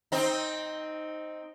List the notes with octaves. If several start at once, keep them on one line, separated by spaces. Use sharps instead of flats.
C4 D#4